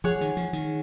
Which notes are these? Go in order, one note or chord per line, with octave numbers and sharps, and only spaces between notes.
F3 G#4 C#5 F#5
D#3
F3
D#3